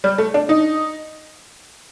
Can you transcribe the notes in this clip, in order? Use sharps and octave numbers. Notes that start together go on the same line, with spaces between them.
G3
A3
D4
D#4